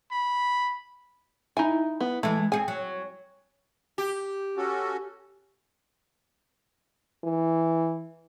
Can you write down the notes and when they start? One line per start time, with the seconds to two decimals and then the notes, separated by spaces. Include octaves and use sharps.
0.12 B5
1.57 D#4 E4 G#5
2.00 B3
2.23 E3 G#3 A3
2.52 C4 G#4 G#5
2.68 F#3
3.98 G4
4.57 C#4 F#4 A4
7.24 E3